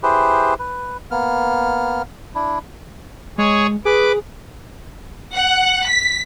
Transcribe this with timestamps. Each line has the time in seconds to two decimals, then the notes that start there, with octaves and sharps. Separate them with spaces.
0.03 E4 G4 G#4 B4 C5
0.59 B4
1.11 A#3 B3 F6
2.35 D4 E4
3.38 G#3 G#4 C#5
3.85 G#4 B4 D6
5.34 F#5
5.87 B6